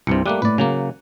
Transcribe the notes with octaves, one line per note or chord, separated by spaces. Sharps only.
C2 G2 C3 C6 C#7
G3 A3 A#3 D6 F#6 D#7
A2 B4 D5
C#3 F#3 A#3 F7